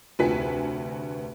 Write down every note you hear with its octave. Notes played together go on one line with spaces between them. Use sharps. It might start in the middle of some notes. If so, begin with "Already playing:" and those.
F1 D2 F#4 B4 G#5 B6